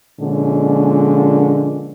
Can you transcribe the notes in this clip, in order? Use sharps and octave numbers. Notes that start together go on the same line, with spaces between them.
A#2 D3 F3 G#3 C#4